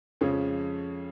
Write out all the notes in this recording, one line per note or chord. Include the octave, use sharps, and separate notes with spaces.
F2 C#3 F3 G#3 C#4